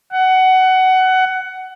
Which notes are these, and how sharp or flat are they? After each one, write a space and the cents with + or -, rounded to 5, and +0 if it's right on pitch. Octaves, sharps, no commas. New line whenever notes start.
F#5 +20